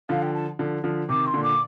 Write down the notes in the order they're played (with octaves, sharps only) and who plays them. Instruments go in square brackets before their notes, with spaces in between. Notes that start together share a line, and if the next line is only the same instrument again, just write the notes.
[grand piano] D3 F3 [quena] F5
[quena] G5
A5
[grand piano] D3 F3
D3 F3
[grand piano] C3 D#3 [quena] D6
[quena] C6
[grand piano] A#2 D3
[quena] D6